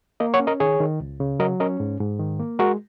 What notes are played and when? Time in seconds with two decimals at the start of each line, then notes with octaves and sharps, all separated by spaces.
0.20 A#3 A#4 D#5
0.34 C#5 F#5
0.40 C#4
0.47 A#4 D#5
0.60 D#3 G#4 C#5
0.80 D#3
1.00 C#2
1.20 C#3
1.40 F#3 A#4 D#5
1.60 C#4 A#4 D#5
1.80 G#2
2.00 G#2
2.20 D#3
2.39 A#3
2.59 G#3 F#4 A#4